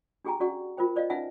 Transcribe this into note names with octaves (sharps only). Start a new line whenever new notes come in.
D4 G4 G#4 G5 G#5 A#5
C#4 F#4 G#4 D5 F#5 C#6
F4 A#4 C5 G5
C5 D5 D#5 F5
C#4 D#4 B4 E5 F#5 G#5